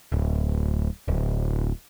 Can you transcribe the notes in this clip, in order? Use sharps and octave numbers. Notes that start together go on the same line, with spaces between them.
D1
D1